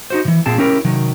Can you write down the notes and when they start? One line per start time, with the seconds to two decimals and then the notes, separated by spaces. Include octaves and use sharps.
0.10 D#4 F#4 C5
0.25 C3 E3
0.46 A#2 C4 G#4 A5
0.58 C#4 E4 G4 A#4
0.85 C3 D#3 F#3